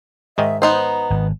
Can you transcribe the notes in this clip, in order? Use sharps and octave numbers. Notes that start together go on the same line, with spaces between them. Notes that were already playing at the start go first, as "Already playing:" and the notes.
G#2 D#3 D#5 E5
B3 D#4 C5 A#5
G#1